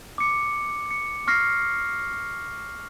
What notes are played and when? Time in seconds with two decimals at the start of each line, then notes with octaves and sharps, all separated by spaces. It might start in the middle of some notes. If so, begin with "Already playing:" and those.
0.18 D6 C#7
0.91 C#7
1.27 C#6 F6 A#6 C7